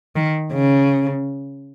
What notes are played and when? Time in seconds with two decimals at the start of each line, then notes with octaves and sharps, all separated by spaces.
0.16 D#3
0.52 C#3